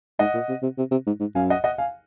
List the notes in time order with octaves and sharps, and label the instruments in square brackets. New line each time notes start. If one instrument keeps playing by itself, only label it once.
[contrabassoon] G#2 [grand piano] D#5 F#5
[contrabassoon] A#2
C3
C3
C3
C3
G#2
G#2
[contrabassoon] F#2 [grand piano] F5 G#5
[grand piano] D#5 F#5
D#5 F#5
F5 G#5